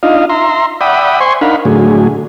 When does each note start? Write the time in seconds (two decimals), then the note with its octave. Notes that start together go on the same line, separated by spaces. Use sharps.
0.03 D4 D#4 F4 D#5 F5
0.30 E5 A#5 C6
0.81 D5 E5 F#5 G5 B5 D#6
1.20 C5 G#5 C6 C#6
1.41 D4 D#4 A#4 F5 F#5 B5
1.65 A2 D3 F#3 G#4